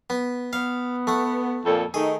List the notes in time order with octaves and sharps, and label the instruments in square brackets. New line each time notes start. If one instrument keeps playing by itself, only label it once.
[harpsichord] B3
[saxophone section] B3 [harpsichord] F5
[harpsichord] A3 F#5
[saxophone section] F2 A#2 A4
[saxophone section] D#3 A3 D#4 [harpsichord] G#4